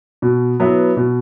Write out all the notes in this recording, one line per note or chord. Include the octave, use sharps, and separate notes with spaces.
B2
F#3 B3 E4 B4
B2